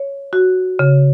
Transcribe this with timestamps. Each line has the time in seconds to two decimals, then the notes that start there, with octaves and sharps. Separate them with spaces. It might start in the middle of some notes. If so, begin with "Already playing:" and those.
Already playing: C#5
0.33 F#4
0.79 C#3